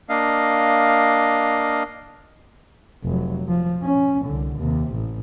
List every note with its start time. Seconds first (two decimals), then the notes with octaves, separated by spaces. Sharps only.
0.09 A#3 D4 D#5 F5
3.04 F1 F#3
3.48 F3
3.83 C#4
4.26 C2 D3
4.57 D#2 C3
4.92 A1